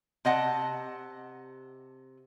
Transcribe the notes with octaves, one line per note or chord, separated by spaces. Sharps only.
C3 D#5 F#5 A5